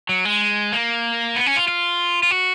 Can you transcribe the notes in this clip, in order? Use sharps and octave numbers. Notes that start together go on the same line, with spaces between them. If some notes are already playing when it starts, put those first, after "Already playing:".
F#3
G#3
A#3
B3
C#4
F4
F4
F4
F#4